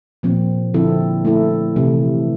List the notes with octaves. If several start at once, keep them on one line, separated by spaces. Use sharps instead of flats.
A#2 F3 C4
D3 F3 C4 E4 A4
A3 E4 A4
C3 E3 A3